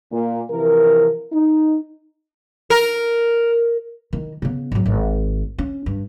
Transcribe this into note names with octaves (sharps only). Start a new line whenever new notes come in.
A#2
C3 E3 F3 A#4
D#4
A#4
D#3 E4
C#3 B3
G#1 F#3
G#1
C#4
G2